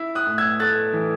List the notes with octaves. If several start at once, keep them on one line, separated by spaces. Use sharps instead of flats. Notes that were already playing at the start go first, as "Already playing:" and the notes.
Already playing: E4
D#6 F#6
A2
E6 G#6
A3 F#6 A6
E3